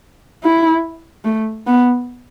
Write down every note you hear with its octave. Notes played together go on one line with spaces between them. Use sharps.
E4
A3
B3